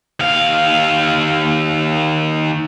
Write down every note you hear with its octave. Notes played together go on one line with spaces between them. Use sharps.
D#2 F5